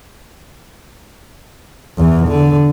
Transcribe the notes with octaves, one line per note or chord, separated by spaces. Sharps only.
E2 E3
D3